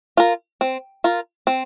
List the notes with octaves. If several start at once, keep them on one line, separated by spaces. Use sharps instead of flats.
F4 A#4
C4
F4 A#4
C4